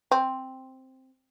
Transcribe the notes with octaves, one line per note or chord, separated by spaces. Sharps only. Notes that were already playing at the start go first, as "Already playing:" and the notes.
C4